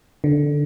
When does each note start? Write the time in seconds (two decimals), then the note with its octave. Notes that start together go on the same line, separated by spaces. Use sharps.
0.24 D3